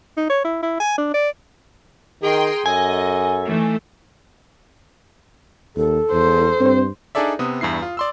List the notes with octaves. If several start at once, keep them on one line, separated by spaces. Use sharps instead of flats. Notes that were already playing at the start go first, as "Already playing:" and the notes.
D#4
C#5
E4
E4
G#5
D4
D5
D#3 G#4 A#4 G5 C6
F#2 A4 D#5 G#5
D#3 E3 A3
D#2 A4
E2 C5
G2 C4
D4 D#4 G#4 A4 D5 E5
C3 B3 D#6
E2 G2 E4 C7
F4
D5 C6 E6